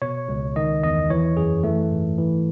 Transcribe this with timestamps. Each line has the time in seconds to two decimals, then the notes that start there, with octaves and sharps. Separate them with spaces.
0.02 B2 C#5
0.29 C#2
0.56 D#3 D#5
0.84 E2 D#5
1.10 E3 C#5
1.37 F#2 G#4
1.64 E3 A3
1.92 G#2
2.18 E3